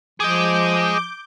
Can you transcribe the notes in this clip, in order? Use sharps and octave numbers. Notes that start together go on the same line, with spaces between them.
F3 G#4 D#5 D6 G6